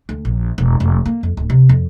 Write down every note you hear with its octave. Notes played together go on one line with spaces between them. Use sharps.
D2
A#1
E1
F1
A#3
F2
D1
C3
F2